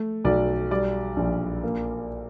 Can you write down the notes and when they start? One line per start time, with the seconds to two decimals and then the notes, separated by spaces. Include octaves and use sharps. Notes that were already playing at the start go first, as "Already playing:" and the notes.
Already playing: A3
0.25 B1 D5
0.71 G3 D5
1.17 A#1
1.64 A#3